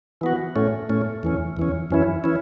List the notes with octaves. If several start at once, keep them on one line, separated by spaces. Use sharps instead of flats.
E3 B3 F#4
A2 A3 C#4
A2 A3 C#4
E2 E3 C#4
E2 E3 C#4
F#2 E3 C#4 E4
E3 C#4 E4